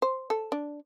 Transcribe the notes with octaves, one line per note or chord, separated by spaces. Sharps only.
C5
A4
D4